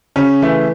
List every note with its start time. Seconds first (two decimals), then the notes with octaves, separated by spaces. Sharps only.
0.16 C#3 C#4
0.42 E3 A3